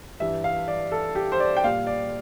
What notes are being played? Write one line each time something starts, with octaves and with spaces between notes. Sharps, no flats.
G2 E3 G3 E5
F5
D5
A4
G4
C5
D5
G5
A#2 G3 F5
D5